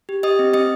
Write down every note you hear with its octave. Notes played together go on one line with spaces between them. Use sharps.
G4
G4 D#5 D#6
C4
C4 D#5 D#6